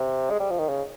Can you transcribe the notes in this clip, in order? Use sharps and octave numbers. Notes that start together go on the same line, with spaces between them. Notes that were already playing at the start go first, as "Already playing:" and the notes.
Already playing: C3
G#3
G3
F3
D#3
C#3